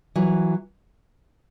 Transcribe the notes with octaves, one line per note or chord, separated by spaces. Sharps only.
E3 F#3